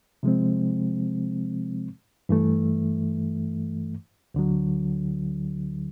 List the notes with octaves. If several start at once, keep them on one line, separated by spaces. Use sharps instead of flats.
C3 F3 G#3 C4
G2 E3 A3
D2 D3 F#3